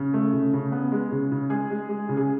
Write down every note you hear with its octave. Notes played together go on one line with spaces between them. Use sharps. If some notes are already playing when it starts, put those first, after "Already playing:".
Already playing: C#3
A3
C#3
C#3
B3
G#3
C#3
C#3
G#3 G#4
G#3
G#3
C#3
G#4